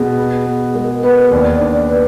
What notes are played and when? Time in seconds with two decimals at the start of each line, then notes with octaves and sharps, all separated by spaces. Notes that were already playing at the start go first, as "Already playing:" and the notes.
Already playing: B2 G#4
0.17 B3
0.46 B3
0.74 G#3 A#4
1.03 B3 B4
1.32 D#2 D5
1.61 D4
1.89 B4